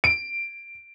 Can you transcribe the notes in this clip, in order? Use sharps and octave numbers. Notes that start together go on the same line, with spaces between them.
D7